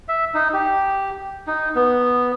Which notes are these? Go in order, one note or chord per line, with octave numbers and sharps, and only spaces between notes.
E5
D#4
G4
D#4
B3